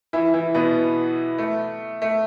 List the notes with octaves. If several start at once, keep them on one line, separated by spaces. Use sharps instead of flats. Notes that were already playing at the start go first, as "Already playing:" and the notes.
E3 E4
E3 E4
B2 B3
A3
A3